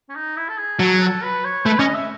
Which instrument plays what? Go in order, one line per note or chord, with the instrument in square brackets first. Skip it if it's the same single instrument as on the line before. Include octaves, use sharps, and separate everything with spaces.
[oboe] C#4
D#4
E4
A4
G#4
[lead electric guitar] F#3 [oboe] A4
[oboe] G#4
A4
B4
C#5
[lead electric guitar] A3 [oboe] B4
[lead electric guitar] C#4 [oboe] D#5
[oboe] E5